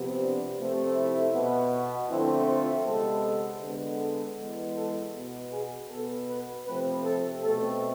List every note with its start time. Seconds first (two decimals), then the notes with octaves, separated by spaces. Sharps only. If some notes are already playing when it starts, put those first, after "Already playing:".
Already playing: C3 F3 B3
0.20 D4
0.58 C3 F3 A3 C4
0.96 E4
1.34 B2 B3
2.10 D3 F3 A3 C4 E4
2.48 F4
2.85 C3 G#3 B3 A4
3.62 D3 G#3 B3
4.00 A4
4.39 E3 G#3 B3
4.77 A4
5.14 B2 B3
5.52 G#4
5.90 B2 B3 A4
6.29 B4
6.66 C3 F3 A3 C4 B4
7.05 A4
7.42 B2 A3 C4 A4